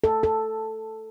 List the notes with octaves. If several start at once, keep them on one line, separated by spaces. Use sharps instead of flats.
A4
A4